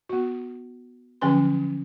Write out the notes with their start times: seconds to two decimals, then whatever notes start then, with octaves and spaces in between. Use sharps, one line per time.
0.09 B3 F#4
1.21 D3 F3 F#3 C#4 B4 C6